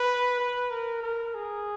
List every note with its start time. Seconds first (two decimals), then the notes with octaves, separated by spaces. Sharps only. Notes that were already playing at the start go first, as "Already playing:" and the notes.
Already playing: B4
0.40 B4
0.71 A#4
1.03 A#4
1.35 G#4